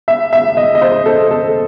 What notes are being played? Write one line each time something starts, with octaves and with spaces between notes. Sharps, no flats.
E5
E5
D#5
D#5
C5
A4
A4